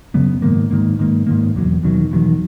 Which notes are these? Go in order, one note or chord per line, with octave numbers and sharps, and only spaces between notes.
F#2 C#3 F#3 B3
G#2 D#3 A#3
G#2 D#3 A#3
G#2 D#3 A#3
G#2 D#3 A#3
E1 E2 D#3 F#3
E1 E2 D#3 F#3
E1 E2 D#3 F#3